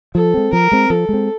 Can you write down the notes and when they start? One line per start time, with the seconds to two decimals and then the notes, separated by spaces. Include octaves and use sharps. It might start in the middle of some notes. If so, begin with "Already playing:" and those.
0.15 F3 A4
0.34 G#3 C4
0.53 F3 A#4
0.72 G#3 C4
0.90 F3 A4
1.09 G#3 C4